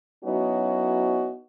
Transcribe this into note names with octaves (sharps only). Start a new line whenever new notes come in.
F#3 B3 C#4 D#4 E4 F#4